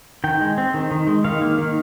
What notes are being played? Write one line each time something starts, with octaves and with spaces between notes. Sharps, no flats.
D#3 G5
G#3
C4
D#3
D#3
G#3
D#3 F5
A#3
D#3